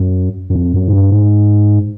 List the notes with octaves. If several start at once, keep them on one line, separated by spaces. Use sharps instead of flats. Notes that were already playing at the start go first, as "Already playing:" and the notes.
Already playing: F#2
F#2
F2
F#2
G#2
G2
G#2